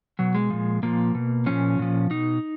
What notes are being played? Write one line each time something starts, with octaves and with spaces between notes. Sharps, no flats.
B2 F#3
G#3
A#2 F3
A#2 F3 A#3
B2
A#2 F3 C#4
A#2 F3
B2 D#4